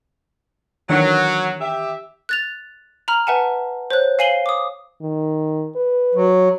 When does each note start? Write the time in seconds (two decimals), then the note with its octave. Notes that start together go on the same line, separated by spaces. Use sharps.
0.90 D#3 E3 F#3 D4
1.61 G4 E5
2.29 F#6 A6 F7
3.08 A#5 B5 F6
3.27 B4 E5 F#5 G#5 A5
3.91 C5 C#5 F#6
4.19 F5 G#5 C7 D#7 F#7 G7
4.46 D6 D#6
5.02 D#3
5.76 B4
6.15 F#3